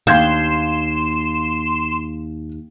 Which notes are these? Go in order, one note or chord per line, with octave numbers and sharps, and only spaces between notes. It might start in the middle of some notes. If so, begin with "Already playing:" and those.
D#2 A#3 F5 C6 G6 G#6 E7